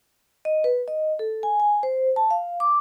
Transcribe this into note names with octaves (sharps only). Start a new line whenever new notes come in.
D#5
B4
D#5
A4
G#5
G#5
C5
A5
F5
D6